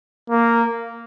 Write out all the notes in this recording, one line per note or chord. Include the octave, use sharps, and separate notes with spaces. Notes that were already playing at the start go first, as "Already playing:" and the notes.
A#3